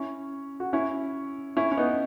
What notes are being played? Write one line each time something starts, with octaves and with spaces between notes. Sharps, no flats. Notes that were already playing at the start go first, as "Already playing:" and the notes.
Already playing: C#4 E4
F#4
C#4 E4
C#4 E4
C#4
B3 D#4